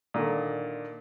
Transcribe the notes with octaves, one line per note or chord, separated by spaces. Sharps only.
A#2 D3 D#3